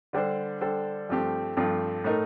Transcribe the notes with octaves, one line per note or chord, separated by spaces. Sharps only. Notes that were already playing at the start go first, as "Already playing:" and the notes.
D3 G3 D4 A4 C5
D3 G3 D4 A4 C5
G2 F3 A3 C4 G4
G2 F3 A3 C4 G4
A2 A3 D#4 A#4